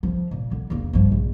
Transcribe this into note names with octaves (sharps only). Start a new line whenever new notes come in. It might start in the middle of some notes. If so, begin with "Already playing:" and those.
F3
A#2
D3
E1 A#3
G2 F3
A#1